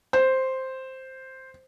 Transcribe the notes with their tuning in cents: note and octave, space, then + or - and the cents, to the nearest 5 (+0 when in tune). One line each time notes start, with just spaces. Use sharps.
C5 +0